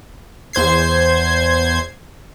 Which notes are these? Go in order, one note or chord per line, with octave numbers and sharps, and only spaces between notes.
E2 C5 G#6 C7